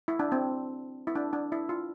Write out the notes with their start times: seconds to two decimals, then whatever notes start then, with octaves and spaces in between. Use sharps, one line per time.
0.08 E4
0.19 D4
0.32 C4
1.07 E4
1.15 D4
1.33 D4
1.52 E4
1.69 F4